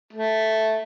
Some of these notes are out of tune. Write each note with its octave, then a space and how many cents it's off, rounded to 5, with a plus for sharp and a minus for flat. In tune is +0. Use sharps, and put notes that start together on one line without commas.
A3 -5